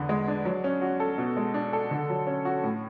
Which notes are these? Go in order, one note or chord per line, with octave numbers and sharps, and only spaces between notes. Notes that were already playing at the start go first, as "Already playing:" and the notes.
Already playing: E2 D3 B3
G#3
D4
F#3
C#4
F#4
A4
B2
G#3
D4
A4
D3
F#3
C#4
F#4
A2